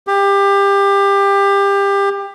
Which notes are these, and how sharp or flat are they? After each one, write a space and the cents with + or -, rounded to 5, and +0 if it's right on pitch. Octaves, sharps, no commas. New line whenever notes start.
G4 +25